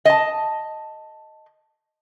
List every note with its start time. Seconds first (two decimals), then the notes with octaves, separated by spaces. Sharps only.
0.05 D#5 A5